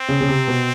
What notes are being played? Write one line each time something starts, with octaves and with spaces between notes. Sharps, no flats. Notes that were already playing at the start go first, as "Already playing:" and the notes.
Already playing: C4
C#3
C#3
C3
B2